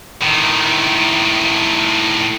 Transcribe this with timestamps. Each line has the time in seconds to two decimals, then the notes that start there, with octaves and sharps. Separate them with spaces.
0.22 A2 D#3